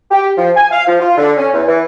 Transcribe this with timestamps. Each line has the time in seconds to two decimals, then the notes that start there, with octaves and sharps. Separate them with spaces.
0.11 G4
0.37 F3
0.56 G#5
0.71 F5
0.87 F3
1.00 F4
1.17 D3
1.38 C#4
1.53 E2
1.68 E3